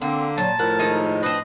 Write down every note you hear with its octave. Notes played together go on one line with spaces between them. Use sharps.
D3 A#3 C4
A#2 F#3 A5
A2 F3 A#4 F#5
D#3 G#3 D#4
C4 D4 B4 D#5